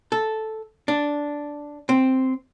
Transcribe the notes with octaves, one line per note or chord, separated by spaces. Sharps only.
A4
D4
C4